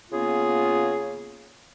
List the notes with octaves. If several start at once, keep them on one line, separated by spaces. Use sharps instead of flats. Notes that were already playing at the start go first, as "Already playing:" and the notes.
C#3 A#3 B3 F4 G#4